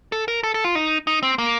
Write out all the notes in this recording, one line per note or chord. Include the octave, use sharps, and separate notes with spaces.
A4
A#4
A4
A4
F4
D#4
D#4
C4
A#3